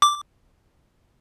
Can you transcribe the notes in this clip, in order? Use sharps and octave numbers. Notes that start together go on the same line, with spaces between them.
D6